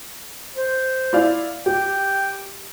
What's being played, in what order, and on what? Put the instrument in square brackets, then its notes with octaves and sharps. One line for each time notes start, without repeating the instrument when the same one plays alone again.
[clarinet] C5
[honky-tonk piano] E4 D5 F5
[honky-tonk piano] G4 [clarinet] G5